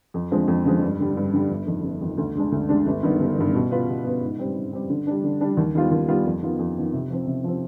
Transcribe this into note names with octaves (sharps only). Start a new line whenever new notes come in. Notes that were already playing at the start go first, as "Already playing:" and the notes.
F2
D3 F3 G#3 C4
F2
D3 F3 G#3 C4
G2
D3 G3
G2
D3 G3
G1
F2 D#3
G1
F2 D#3
D2
D3 G#3 D4
D2
D3 G#3 D4
G1
G2 D#3 B3
G1
G2 D#3 B3
B2
B3 F4 B4
B2
B3 F4 B4
G#2
G3 C4 G4
G#2
G3 C4 G4
D3
G3 D4
D3
G3 D4
D#2
D#3 G3 B3 F4
D#2
D#3 G3 B3 F4
F2
D#3 B3 F4
F2
D#3 B3 F4
C3
F3 C4
C3
F3 C4